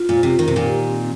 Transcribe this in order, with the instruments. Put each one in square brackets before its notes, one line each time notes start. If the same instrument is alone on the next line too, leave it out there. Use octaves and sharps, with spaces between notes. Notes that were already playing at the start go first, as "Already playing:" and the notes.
Already playing: [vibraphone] F4
[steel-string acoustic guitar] A#2
[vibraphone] C5
[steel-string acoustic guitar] C3
[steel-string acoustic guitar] D#3 [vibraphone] A#4
[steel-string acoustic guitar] C3
A#2 D#3
[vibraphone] G4
C4